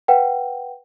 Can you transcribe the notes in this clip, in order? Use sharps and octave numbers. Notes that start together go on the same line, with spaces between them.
B4 F#5 G5